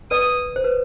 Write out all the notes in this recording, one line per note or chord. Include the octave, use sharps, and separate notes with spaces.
B4 D5 D#6
C5
B4